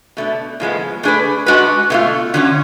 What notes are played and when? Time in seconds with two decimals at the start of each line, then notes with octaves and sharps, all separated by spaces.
0.17 B2 A3 D4
0.60 A2 F3 G#3 B3
1.03 A3 D4 G#4 B4
1.46 G#3 D4 F#4 B4
1.90 B2 A3 F4
2.34 D3 F#3 C#4